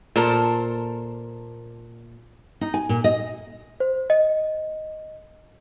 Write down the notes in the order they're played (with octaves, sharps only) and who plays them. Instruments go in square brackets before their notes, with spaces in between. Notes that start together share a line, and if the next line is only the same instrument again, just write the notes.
[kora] A#2 [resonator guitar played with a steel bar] A4 A#4 C5
[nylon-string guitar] D#4
G#5
A#2
D#5
[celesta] C5
D#5